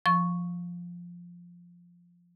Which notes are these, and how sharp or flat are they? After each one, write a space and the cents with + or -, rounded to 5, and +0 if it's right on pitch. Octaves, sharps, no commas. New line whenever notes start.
F3 +0 C#6 +0